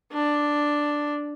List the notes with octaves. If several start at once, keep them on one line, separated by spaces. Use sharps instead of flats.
D4